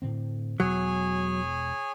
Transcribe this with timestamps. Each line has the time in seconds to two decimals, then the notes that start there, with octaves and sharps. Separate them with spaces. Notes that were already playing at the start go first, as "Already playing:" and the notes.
0.02 A2 D3 C4
0.60 E1 B2 F#3 G#4 C#5 G#5